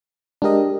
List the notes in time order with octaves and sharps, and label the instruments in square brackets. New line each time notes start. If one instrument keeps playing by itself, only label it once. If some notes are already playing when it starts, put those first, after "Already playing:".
[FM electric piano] G#3 D4 G4 A#4 D#5